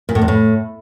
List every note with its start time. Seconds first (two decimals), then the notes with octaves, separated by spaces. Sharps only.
0.09 A#2
0.15 A2
0.22 E2
0.28 A2